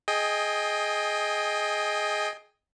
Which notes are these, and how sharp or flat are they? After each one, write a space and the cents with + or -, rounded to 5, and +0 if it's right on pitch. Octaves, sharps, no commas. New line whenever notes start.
G#4 +15 D#5 +0 G5 +25